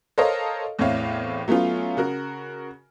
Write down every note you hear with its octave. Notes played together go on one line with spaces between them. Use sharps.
A4 A#4 C5 C#5 D#5 F5
E2 A2 C4 E4 C#5 F5
F#3 A3 B3 C#4 F4
C#3 F#4 A#4